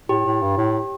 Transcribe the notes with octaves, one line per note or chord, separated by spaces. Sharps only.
A2 G4
A2
G2
A2